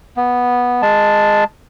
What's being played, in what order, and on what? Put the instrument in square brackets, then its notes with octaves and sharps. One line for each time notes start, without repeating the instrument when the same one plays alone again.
[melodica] B3
G#3 A5